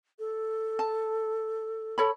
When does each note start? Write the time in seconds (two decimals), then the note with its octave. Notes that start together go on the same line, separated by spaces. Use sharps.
0.19 A4
0.79 A5
1.98 A4 C#5 B5